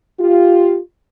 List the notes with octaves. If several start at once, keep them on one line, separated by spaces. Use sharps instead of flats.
F4 G4